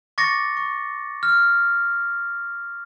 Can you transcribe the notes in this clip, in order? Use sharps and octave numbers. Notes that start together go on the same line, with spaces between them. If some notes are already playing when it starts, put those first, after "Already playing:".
C#6 D6 A6 A#6 C#7
C#6
F6